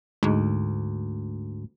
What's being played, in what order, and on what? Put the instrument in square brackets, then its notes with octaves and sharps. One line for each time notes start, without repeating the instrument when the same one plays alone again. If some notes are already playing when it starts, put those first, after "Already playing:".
[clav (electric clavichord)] D2 [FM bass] G#2